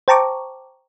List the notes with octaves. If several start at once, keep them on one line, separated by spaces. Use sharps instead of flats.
C5 G5 A5 A#5 C#6 D6